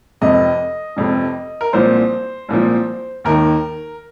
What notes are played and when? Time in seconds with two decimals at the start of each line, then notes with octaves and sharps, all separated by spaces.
0.21 F1 F2 C3 D#5
0.97 F1 F2 C3
1.61 A#4
1.73 C2 A#2 F3 C5
2.48 C2 A#2 F3
3.24 D#2 D#3 A#4